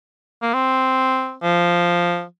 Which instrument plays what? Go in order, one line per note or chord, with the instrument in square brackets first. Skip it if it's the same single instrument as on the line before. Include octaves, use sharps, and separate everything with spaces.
[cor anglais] A#3
C4
F3